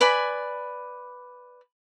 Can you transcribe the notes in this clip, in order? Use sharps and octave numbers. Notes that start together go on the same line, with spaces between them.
B4 D5 G#5 B5